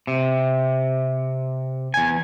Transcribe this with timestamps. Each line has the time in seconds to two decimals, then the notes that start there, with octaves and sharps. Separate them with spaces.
0.07 C3
1.94 E2 G#5